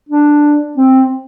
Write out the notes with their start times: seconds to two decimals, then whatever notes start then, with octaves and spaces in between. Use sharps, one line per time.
0.09 D4
0.77 C4